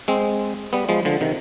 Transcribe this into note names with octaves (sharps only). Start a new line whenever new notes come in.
G#3 C4
G3 B3
F3 G#3
D3 F3
C3 D#3